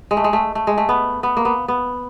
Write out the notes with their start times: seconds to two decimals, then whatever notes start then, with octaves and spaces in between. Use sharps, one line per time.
0.11 G#3
0.17 A3
0.24 G#3
0.33 A3
0.55 A3
0.67 G#3
0.78 A3
0.89 B3
1.23 B3
1.37 A#3
1.45 B3
1.68 B3